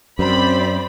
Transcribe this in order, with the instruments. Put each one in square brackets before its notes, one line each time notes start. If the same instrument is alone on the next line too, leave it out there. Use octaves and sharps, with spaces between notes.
[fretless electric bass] F#2 [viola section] C4 D5 B5 [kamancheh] C5